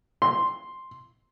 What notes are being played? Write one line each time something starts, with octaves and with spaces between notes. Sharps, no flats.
C6